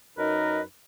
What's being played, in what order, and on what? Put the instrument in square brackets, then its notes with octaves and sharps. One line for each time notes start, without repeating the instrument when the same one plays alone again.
[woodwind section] F#2 D#4 A#4 B4 D#5